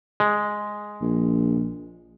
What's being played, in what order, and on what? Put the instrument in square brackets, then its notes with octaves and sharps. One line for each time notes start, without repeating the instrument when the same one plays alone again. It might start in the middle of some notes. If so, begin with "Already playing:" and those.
[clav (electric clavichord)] G#3
[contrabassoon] A#1